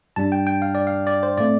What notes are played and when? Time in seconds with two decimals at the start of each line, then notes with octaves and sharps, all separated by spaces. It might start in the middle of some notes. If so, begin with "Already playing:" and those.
0.16 G2 G3 D4 A5
0.32 G5
0.47 G5
0.62 F5
0.75 D5
0.87 F5
1.07 D5
1.23 C5
1.37 A2 A3 C4 D5